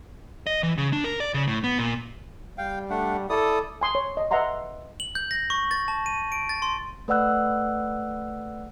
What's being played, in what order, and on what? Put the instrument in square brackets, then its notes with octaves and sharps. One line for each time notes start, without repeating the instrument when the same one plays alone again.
[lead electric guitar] D#5
E3
C#3
D4
A#4
D5
C#3
A2
B3
A#2
[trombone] G3 [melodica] F5 G5
[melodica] A3 D4 F#5
[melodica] E4 D5 D#6 [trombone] A4
[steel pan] G#5 C6 D#6
C#5
D#5
B4 D#5 E5 F#5 A#5 C6
[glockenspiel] F#7
G6
A#6
C#6
A6
A5
D#7
D7
A6
C6
[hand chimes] A3 B4 D5 F#5 E6 F#6